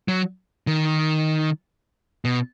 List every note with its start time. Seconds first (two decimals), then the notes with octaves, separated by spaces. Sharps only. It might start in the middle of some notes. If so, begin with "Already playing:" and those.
0.08 F#3
0.67 D#3
2.25 B2